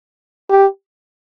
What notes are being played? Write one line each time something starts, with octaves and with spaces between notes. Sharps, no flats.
G4